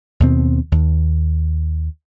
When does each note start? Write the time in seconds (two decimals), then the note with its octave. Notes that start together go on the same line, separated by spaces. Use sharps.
0.20 D#2 B2 C4
0.72 D#2